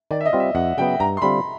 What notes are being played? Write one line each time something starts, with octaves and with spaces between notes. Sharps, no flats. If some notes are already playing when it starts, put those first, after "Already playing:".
D#3 D5
E5
D#5
G3 C4 F4
E5
F2 F#5
C#3 F#3 B3 G5
G2 A#5
C6
D3 G3 C4 F4 B5